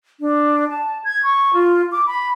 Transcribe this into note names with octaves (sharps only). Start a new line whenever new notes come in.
D4
A5
G#6
C#6
F4
D6
B5